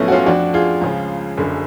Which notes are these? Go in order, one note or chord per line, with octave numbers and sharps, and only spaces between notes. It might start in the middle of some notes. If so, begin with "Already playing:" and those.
Already playing: B1 A2 F3 A3 B3 C#4
F#4
C#4 F4
F2 F3 D4 F#4
F4 G#4
C#2 C#3 F3
F#1 F#2 D3